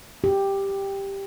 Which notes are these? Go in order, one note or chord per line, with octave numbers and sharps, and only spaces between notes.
G4